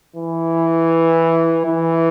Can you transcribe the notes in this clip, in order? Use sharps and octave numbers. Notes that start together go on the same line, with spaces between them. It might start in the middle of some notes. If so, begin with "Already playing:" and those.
E3
E3